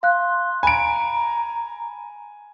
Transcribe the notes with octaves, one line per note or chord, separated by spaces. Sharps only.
F5 C6 F#6
G#5 A#5 B5 D7